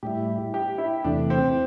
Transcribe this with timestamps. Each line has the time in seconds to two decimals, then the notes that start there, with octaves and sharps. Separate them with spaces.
0.03 A2 G3 E4 G4
0.54 G4
0.78 E4
1.04 E2 C3 E3 A3 D4
1.30 C4